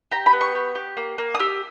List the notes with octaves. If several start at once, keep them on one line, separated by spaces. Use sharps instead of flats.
G4 A#5
B5
B3
C#6
G4
G4
A#3
A#3
D#6
G4 E6